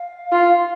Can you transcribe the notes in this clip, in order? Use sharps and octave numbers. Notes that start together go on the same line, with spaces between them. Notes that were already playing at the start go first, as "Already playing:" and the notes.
Already playing: F5
F4